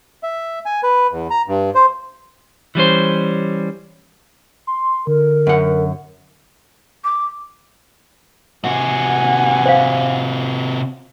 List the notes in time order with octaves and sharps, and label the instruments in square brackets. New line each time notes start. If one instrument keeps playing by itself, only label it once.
[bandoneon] E5
G#5
B4
E2
A#5
G2
C5
[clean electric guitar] E3 G3 C#4 C5
[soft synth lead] C6
[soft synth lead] D3 [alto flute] A#4
[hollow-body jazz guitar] F#2 F#5
[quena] D6
[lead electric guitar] C3 F#4 [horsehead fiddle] F#5 G#5
[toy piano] C5 F5